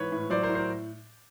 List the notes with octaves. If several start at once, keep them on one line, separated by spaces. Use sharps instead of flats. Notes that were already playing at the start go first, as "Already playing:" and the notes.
Already playing: G#2 E3 B4 C#5
A2
F#3 C5 D5
A#4 C5
A2
A#4 C5